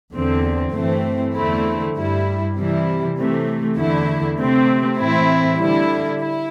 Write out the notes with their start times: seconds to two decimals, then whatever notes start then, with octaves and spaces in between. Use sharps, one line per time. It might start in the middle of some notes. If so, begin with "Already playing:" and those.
0.14 E2 D3 C4
0.74 G2 E3 A3 C4
1.34 E2 D3 A3 C4 E4
1.95 G2 G3 E4
2.55 C3 E3 G3 E4
3.16 C3 E3 A3
3.77 E2 D3 A3 E4
4.38 C3 A3 C4
4.98 A2 E3 C4 E4
5.59 D3 G3 E4
6.20 E4